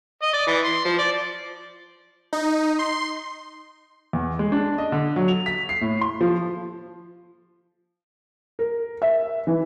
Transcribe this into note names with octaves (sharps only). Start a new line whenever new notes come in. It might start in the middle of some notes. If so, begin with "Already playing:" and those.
D#5
D5
E3
C6
F3
D5
D#4
C6
E2
G#3
D4
D#5
D3
F#3
F7
B6
C7
A2
C6
F3
A#4
E5
E3